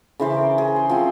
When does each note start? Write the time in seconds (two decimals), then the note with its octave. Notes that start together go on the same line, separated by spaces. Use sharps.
0.20 C#3 E3 C5 D6
0.34 A#4
0.58 G#4
0.76 C6
0.89 F3 C4